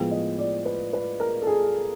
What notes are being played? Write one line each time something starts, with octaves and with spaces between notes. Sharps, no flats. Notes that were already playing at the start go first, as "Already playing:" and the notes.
Already playing: A2 F3 G#3 B3 G5
D#5
D5
B4
B4
A#4
A4
G#4